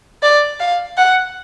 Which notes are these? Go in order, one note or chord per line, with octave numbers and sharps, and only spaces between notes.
D5
F5
F#5